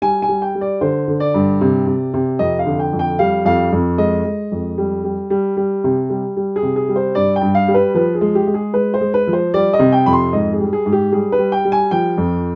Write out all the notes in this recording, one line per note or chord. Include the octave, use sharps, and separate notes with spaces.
G3 G#5
G#5
G3
G5
G3
D5
D3 C5
D3
D5
G2
C3
C3
C3
F2 D#5
F5
D3
G5
F2
G5
G3 F5
F2 F5
F2
G#3 D#5
G#3
F2
G3
G3
G3
G3
C3
G3
G3
G#4
C3
G#4
G3
C5
G2 D5
G5
G2
F5
G3
B4
F3 B4
G#4
G#3
G4
G#3
G#4
G#3 B4
C5
G#3
B4
F3
C5
G3 D5
D#5
C3
G5
F2 B5
C6
G#2 D#5
G#4
G3
G#4
G#2
G4
G3 G#4
B4
G3
G5
G3
G#5
F3 G5
F2